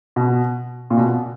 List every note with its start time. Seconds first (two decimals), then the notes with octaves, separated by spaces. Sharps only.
0.16 B2
0.90 A#2
0.97 B2